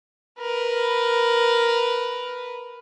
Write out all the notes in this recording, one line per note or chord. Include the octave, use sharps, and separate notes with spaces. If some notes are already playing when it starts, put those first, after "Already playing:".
A#4 B4